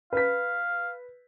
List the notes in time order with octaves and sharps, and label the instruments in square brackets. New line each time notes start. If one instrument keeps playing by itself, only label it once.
[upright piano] B4 B6 [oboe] F5